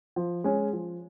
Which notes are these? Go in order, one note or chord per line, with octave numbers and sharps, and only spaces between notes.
F3
G#3 C#4
F3